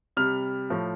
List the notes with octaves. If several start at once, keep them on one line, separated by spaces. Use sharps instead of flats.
C3 G3 F6
A2 F3